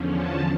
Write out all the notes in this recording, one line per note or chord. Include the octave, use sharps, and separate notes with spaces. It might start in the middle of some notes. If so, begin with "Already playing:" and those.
Already playing: E2 D3 F3 C#4
A5